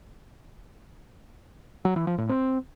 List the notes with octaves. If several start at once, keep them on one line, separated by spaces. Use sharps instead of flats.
F#3
E3
F3
A2
C4